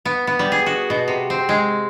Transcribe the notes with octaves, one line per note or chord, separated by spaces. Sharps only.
B3
B3
G3
G#4
F#4
B2
C3
C4
G#3